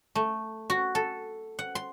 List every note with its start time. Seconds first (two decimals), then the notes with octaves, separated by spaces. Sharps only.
0.15 A3
0.70 F#4
0.95 A4
1.59 F#5
1.75 C6